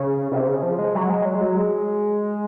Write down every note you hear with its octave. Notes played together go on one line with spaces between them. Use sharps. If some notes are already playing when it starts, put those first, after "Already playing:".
Already playing: C#3
C3
C#3
F3
G#3
F#3
G#3
F#3
G#3
F#3
G#3